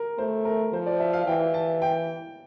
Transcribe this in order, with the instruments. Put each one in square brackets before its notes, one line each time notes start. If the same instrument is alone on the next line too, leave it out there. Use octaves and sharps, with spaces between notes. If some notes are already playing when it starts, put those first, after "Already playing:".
Already playing: [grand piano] A#4
[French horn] A3 [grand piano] C5
[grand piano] A#4
[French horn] F3 [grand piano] C5
[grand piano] D5
E5
F5
[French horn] E3 [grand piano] G5
[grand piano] A5
G5